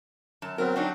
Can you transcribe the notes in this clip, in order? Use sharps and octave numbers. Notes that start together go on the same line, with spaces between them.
F#2 A5
F#3 B3 C4 A#4
F#3 C4 D4 D#4 F#4